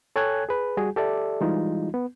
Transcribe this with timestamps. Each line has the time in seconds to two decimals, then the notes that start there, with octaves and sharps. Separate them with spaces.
0.16 A4 C#5 G5 G#5 F#6 G#6
0.49 G#4 B4
0.77 G3 F#4 G#4
0.96 G4 A4 D5 E5
1.41 E3 G3 G#3 D#4 F4
1.94 B3